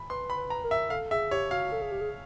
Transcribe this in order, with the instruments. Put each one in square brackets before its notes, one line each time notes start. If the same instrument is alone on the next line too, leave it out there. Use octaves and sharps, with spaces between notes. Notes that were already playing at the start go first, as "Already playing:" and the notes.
Already playing: [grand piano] B5
[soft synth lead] B4 [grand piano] C6
[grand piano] B5
[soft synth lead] B4
[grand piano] A#5
[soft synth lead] A#4
[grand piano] E5
[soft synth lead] A4 [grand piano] F5
[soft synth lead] G#4 [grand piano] E5
[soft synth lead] G4 [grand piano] C#5
[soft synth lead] F#4 [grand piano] F5
[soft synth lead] A4
G#4
G4
G#4